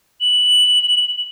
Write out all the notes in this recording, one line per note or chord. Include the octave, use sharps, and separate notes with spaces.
F#7